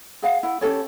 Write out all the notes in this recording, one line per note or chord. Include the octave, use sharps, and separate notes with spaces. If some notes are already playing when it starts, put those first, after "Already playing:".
G#4 F5 F#5
E4 F#5
C#4 G4 A4 C#5